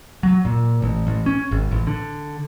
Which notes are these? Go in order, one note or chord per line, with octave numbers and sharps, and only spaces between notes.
F#3
A#2
A1
A1
C#4
G#1
A1
D3